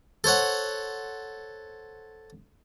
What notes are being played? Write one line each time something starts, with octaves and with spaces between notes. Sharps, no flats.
A4 C5 C#5 F#5